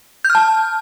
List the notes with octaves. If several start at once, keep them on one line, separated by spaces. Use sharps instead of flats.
G6
F6
A5